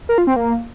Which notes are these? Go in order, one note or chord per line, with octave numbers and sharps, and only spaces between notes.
A#4
F4
C4
A#3